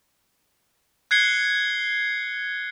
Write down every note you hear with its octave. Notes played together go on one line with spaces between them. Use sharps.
F#6 G#6 C7 C#7 G7